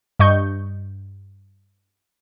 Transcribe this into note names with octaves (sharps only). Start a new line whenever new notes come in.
G2 D#5 C#6 G6